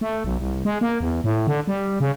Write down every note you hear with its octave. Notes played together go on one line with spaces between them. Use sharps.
A3
B1
C2
G#3
A#3
E2
A2
D3
G3
C#3